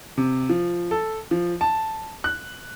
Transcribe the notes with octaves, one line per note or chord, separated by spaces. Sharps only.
C3
F3
A4
F3
A5
F#6